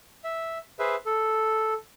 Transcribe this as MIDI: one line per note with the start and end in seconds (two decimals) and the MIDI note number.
0.24 0.58 76
0.79 0.95 68
0.79 0.95 71
0.79 0.95 72
0.79 0.95 76
1.06 1.74 69